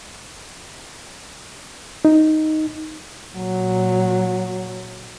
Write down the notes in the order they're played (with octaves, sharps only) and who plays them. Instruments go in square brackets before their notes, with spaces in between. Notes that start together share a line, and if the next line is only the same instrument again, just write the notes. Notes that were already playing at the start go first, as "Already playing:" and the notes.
[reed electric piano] D#4
[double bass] A#2 F#3